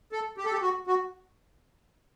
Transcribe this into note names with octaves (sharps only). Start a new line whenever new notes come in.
A4
G4
A4
G4
F#4
F#4